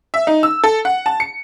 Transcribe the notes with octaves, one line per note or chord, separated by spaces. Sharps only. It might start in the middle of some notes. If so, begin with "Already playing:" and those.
E5
D#4
E6
A4
F#5
A5
C#7